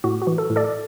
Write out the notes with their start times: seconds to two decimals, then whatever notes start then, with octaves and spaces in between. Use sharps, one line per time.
0.04 A2 F#4
0.22 F#4
0.27 E3
0.38 A4
0.50 A2
0.56 A4 D5